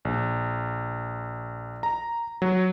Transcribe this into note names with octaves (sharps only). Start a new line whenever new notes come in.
A#1
A#5
F#3